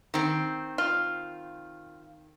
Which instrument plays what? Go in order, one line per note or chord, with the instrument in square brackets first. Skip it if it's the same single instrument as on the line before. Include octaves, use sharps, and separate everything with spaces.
[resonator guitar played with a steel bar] D#3 C4
[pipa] F4